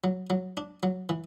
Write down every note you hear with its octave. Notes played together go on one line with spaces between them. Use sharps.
F#3
F#3
D4
F#3
E3